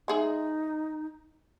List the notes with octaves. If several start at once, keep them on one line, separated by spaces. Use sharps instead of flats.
G#3 D#4 G#4 E5